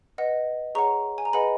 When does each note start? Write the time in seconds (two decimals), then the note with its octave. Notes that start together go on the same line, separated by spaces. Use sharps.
0.18 B4 D#5 F#5
0.75 G#4 C#5 F#5 A#5 C#6
1.18 G#5
1.25 A#5
1.33 G#4 B4 D#5 F#5 G#5 B5